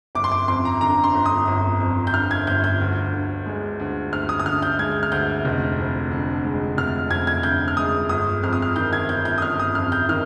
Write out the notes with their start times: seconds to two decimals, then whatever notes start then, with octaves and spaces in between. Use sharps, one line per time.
0.15 G1 D6
0.24 C6
0.32 D6
0.48 F2 C6
0.65 A#5
0.81 D3 A#5
1.04 C6
1.15 G1
1.26 D#6
1.48 G1
1.80 F2
2.07 G6
2.14 D3 F6
2.31 G#6
2.47 G1 G6
2.64 G6
2.80 D2
3.13 D3
3.46 G#3
3.80 D2
4.12 D2 F6
4.29 D#6
4.39 D#6
4.46 D3 F6
4.62 G6
4.79 G#3 G#6
5.03 F6
5.12 D2 G6
5.45 F1
5.78 F2
6.11 D3
6.45 G#3
6.77 F1 F6
7.10 F2 G#6
7.27 G#6
7.43 D3 G6
7.68 F6
7.77 G#3 D#6
8.09 G1 D#6
8.43 F2 F6
8.53 D#6
8.62 F6
8.76 D#3 G6
8.93 G#6
9.09 G1 G6
9.25 G6
9.38 D#6
9.42 G1 F6
9.60 D#6
9.75 F2 F6
9.92 G6
10.09 D#3 F6